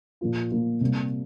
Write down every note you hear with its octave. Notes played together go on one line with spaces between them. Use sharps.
A#2 F3 A#3 F4
A#2 F3 A#3 F4
C3 G3 A#3